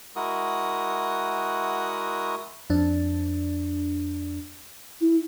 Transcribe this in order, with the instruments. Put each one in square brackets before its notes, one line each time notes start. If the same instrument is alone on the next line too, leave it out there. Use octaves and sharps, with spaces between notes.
[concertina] G#3 E4 F#4 A#4 F#5 D#6
[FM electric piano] F2 D4
[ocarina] E4